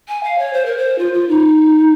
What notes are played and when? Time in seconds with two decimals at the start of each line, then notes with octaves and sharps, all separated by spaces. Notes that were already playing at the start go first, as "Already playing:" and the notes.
0.08 G#5
0.23 F5
0.39 C#5
0.53 C5
0.66 A#4
0.78 C5
0.99 F4
1.14 F4
1.29 D#4